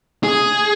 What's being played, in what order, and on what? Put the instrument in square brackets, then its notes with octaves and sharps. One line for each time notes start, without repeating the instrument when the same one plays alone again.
[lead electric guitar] G#4